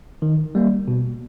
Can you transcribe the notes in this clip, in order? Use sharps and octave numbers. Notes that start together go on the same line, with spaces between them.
D#3
G3 A#3
B2